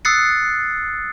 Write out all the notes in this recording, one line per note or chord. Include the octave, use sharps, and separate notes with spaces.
D#6 E6 F#6 A6 C7 C#7